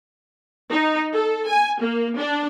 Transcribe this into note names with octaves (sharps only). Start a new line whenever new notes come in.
D#4
A4
G#5
A#3
D4